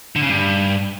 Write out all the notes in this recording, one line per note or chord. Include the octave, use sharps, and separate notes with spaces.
D3
C#3
G2